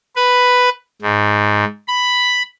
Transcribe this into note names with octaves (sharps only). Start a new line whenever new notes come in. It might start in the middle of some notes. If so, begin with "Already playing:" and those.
B4
G#2
B5